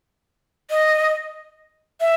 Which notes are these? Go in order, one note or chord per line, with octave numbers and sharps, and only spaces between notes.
D#5
E5